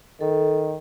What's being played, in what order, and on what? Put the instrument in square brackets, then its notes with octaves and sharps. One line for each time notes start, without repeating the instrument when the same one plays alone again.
[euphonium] D#3 [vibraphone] A4